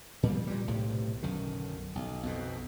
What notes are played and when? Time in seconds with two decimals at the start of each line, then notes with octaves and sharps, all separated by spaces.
0.23 A#2 F3 G3 A#3
0.47 A#2 G3
0.67 B1 A2 C3
1.23 B1 F#2 D3 D#3
1.95 B1
2.23 B1 F2 B2